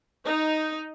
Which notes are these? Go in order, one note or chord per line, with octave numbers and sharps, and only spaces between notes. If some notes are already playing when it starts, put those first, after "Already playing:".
D#4